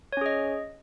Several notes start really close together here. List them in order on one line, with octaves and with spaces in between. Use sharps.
C#5 C#4 G#4 D#5